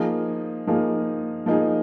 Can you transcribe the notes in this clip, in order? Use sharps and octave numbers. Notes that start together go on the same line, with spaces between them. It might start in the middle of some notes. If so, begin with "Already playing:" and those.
Already playing: F3 A#3 D#4 G#4
F3 A#3 D#4 G#4
F3 A#3 D#4 G#4